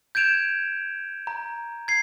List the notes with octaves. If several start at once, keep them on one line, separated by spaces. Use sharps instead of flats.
G6 G#6 D7 E7 F7
A#5
G#6 C7